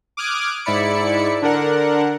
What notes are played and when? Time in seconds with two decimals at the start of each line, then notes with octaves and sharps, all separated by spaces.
0.17 D6 D#6 F6 F#6 G#6 D7
0.65 G#2 E4 D5 B5 C#7
1.42 D3 D4 A#4 F#5